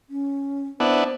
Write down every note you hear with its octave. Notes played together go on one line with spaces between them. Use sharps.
C#4
B3 D4 E4 C5